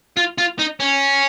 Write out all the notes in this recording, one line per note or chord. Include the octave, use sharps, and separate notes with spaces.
F4
F4
D#4
C#4